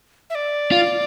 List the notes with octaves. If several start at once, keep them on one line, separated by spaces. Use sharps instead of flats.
E5
D5
F4